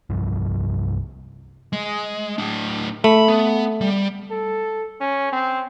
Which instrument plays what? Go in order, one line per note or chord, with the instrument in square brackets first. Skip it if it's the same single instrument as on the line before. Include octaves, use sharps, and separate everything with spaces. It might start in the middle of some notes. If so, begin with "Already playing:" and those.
[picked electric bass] C2 G2 F3
[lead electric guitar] G#3
A2 D4
[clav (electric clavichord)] A3 [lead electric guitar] B5
[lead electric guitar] B3
G3
[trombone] A4
C#4
C4